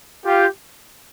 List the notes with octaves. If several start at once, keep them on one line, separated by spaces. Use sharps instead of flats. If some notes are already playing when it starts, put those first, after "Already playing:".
F4 G4